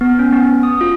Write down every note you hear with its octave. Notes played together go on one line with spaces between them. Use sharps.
B3
C#4
B3
D#6
F4